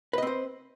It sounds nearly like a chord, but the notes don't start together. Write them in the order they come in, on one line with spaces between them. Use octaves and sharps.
B4 D#5 C4 C5